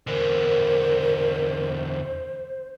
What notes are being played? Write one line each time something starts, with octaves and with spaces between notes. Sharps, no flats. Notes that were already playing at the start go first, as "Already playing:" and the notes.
E2 D3 A#4 C5